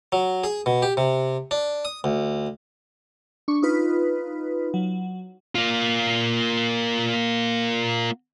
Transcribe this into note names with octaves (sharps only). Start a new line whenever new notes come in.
F#3
G#4
B2
G4
C3
D4
D#6
D2
D4 C#6
D#4 F4 B4
F#3
A#3 F4